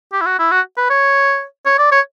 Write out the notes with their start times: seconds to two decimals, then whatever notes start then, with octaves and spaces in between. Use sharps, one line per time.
0.13 G4
0.21 E4
0.26 F#4
0.39 E4
0.51 F#4
0.77 B4
0.90 C#5
1.66 C#5
1.78 D5
1.91 C#5